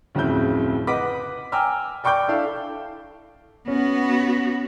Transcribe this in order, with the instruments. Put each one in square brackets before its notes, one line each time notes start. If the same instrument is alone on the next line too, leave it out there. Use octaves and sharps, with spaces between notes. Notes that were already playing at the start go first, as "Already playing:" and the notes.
[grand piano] D1 F2 C#3 C4 E4 G6
B4 D#5 F#5 D6 B6
G5 G#5 A#5 D6 E6 F6
D5 G5 C#6 D6 G6
D4 E4 A4 F5
[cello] B3 F#4 [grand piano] C#4